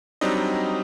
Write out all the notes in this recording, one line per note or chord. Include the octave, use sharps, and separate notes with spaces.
F#3 G3 C4 D4 D#4 D#5